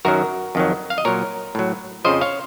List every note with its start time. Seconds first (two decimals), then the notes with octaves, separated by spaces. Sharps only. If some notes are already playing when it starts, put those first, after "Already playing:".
0.05 F#2 D#3 F#3 F#4 A#4
0.55 F2 D#3 F#3
0.90 F5
0.98 D#5
1.05 A#2 F#3 A#4 C#5
1.55 A2 F#3
2.05 F2 C#3 F3 C5 D#5
2.21 C#5 F5